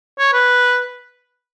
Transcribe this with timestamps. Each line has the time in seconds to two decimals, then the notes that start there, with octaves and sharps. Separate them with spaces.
0.19 C#5
0.33 B4